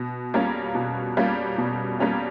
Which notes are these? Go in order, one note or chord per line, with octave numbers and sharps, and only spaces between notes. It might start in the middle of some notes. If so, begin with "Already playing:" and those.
Already playing: B2
G3 A#3 C#4 F4
B2
G3 A#3 C#4 F4
B2
G3 A#3 C#4 F4